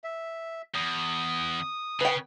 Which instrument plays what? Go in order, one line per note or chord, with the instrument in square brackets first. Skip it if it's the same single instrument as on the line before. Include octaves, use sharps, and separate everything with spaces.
[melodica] E5
[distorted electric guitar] E2 [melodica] D#6
[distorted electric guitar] C#3 [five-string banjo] B4 G5